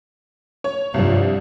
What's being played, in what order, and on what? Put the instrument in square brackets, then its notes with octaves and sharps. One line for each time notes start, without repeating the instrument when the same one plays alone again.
[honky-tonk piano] C#5
[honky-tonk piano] C2 F3 [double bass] G2